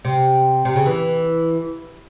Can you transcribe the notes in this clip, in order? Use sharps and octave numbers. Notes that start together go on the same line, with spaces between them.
C3
C3
C#3
E3